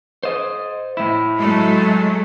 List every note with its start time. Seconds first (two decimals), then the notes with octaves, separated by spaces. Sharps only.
0.23 C5 D#5
0.97 A2 E4
1.39 F#3 G#3 A3